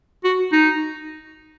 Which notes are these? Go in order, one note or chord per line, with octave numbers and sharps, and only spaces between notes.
F#4
D#4